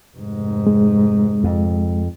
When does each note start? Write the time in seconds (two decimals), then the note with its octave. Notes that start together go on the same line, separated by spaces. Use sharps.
0.17 F1 G#2
0.67 G#3
1.44 F2